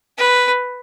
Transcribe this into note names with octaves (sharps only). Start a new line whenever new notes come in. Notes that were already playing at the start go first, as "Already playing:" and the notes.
B4